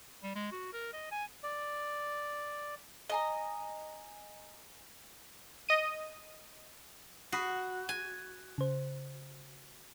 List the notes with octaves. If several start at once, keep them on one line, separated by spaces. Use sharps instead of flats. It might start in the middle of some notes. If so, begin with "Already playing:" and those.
G3
G#3
F#4
A#4
D#5
G#5
D5
D#5 G#5 A#5
D#5 D#7
F#4 B5 D#6 C7
G#5
C#3 C5